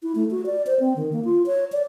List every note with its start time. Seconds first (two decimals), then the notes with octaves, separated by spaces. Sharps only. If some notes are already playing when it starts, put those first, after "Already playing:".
0.03 E4
0.15 A3
0.31 F#4
0.46 D5
0.67 C5
0.80 C4
0.96 D#3
1.13 A#3
1.25 F4
1.46 C#5
1.72 D5